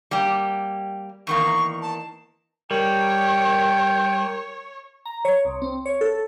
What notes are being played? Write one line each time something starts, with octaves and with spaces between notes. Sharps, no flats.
G3 A#3 G4
E2 D#3 A#3 C#6
A5
G3 A#4 C#5 G5
A#5
C#5
C2
C4
C#5
A4